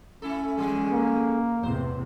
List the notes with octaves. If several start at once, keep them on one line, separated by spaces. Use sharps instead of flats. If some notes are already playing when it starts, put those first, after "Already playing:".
A3 C#4 E4 A4
D3 E3 G#3 A4
A#3
E2 A2 C3 C5